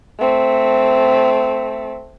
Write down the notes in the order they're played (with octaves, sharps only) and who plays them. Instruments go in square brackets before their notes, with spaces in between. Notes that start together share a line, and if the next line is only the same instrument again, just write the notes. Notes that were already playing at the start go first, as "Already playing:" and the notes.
[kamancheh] A3 C4